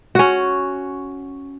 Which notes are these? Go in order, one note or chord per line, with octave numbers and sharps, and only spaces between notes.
C#4 F#4